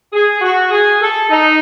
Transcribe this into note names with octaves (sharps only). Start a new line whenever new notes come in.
G#4
F#4
G#4
A4
D#4